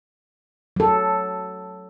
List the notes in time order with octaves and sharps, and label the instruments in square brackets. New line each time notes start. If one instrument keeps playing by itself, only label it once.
[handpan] F#3 A4